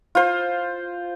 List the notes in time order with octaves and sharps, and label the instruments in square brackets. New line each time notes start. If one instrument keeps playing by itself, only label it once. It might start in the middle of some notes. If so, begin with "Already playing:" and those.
[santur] F4 C5